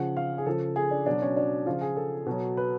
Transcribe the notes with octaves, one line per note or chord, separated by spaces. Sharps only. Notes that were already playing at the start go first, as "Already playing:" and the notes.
Already playing: C#3 F3 F#5
F5
G#4
C#3 F3 A4
G#4
D4
B2 F#3 D4
C#4
D4
C#3 F3 F4
G#4
A4
B2 F#3
B4